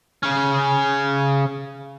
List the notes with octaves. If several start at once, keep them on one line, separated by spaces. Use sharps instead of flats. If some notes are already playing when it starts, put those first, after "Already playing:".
C#3 C#4